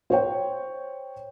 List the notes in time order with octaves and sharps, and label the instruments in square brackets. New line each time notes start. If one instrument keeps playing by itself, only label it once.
[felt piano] C5 C#5 G5